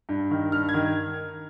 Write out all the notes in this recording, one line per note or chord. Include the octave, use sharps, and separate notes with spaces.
G2
D#3
G2 F6
G#6
D#3